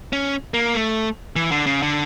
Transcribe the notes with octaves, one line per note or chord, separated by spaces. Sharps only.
C#4
A#3
A3
E3
D3
C#3
D3